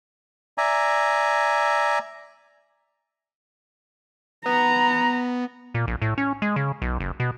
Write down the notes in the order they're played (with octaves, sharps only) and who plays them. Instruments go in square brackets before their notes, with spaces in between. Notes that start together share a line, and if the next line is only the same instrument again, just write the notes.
[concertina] D5 E5 G#5 A#5
[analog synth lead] B3 [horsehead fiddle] A#5
[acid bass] A#2
A#1
A2
C#4
G#3
C#3
B1
F#1
B2